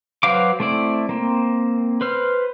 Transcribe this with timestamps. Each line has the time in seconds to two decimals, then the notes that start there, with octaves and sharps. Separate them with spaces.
0.23 F#3 B4 C5 F5 D6
0.60 A3 C4 E4 D5
1.09 A#3 C4
2.01 B4 C5 F6